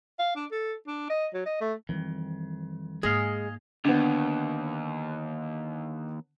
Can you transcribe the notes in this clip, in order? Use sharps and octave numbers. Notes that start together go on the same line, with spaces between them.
F5
D4
A4
D4
D#5
F#3
D#5
A3
F2 D#3 E3 G3
G#2 G#3 A#3 G#4 D#5 F5
D#2 D3 B3